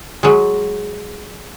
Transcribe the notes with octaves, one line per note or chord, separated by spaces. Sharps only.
F#3 G#3